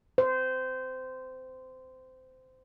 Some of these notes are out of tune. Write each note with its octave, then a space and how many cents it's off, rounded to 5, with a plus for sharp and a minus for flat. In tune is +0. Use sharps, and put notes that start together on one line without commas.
C5 -20